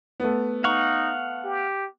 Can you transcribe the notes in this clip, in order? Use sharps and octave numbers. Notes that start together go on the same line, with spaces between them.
A3 B3
D#4 F5 F#5 C#6
G4